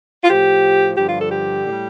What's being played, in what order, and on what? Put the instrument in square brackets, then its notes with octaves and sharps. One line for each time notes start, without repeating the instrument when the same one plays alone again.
[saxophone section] F4
A2 F3 G4
G2 D3 F3 G4
F4
A4
G4
A2 G3